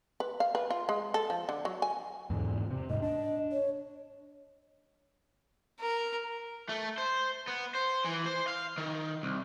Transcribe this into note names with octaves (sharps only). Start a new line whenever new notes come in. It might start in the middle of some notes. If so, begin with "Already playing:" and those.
B4
F5
B4
F4
G#3
A4
F3
D3
F#3
G#5
E2 G#2 D3
C3
D#1 G#2 D#5
D4 D#5
C#5
A#4
A3
C5
B3
C5
E3
C5
F5
D#3
C2